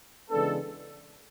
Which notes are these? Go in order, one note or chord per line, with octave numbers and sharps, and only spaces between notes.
C#3 E3 G#3 B3 D4 A4